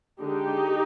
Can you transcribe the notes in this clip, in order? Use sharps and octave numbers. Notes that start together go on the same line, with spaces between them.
D3 G#3 D4 D#4 G4